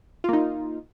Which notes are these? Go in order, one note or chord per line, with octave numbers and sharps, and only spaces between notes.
A#3 D#4 F4